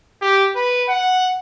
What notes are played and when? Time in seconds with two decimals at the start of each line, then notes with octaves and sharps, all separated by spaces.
0.21 G4
0.56 B4
0.89 F#5